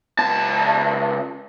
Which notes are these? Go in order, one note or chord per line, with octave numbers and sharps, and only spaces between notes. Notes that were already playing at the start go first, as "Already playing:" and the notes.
C#2 A5